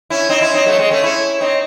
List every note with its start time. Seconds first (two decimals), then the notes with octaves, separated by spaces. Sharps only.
0.10 C#4 E4
0.29 C4 D#4
0.41 C#4 E4
0.54 C4 D#4
0.66 F#3 A3
0.79 G#3 C4
0.91 A3 C#4
1.03 C#4 E4
1.41 C4 D#4